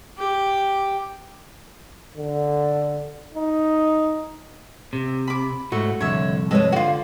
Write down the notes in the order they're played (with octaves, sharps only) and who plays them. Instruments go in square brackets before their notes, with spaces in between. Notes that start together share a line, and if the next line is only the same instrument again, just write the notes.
[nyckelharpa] G4
[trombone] D3
D#4
[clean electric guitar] C3
[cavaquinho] B5 D6
[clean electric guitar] G#2 A3 [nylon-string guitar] F#4 [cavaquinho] C#6
[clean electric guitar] C2 F2 [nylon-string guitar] D3 [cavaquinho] C#5 E5
[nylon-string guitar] G#3 B4 C#5 [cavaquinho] A4 D#5
[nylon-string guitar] D3 [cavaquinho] F4 F#4